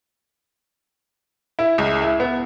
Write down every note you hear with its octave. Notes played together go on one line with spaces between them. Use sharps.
E4
C#2
E4
B3